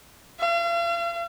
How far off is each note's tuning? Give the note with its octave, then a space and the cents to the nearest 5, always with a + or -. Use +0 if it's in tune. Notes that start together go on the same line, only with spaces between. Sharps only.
F5 -40